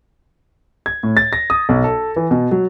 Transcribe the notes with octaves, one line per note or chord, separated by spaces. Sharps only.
G#6
A2
A6
A#6
D#6
B1
A4
E3
B2
F#3